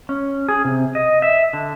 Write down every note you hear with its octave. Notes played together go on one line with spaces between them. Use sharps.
C#4
G#4
C3
D#5
E5
D3